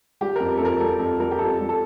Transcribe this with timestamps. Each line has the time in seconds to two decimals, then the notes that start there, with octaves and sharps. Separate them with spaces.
0.21 G3 G4
0.36 F2 A#4
0.57 A4
0.60 F2 A#4
0.80 G3 A4
0.99 F2 A4
1.19 G3 A#4
1.31 G4
1.39 F2 A4
1.60 G3
1.69 A4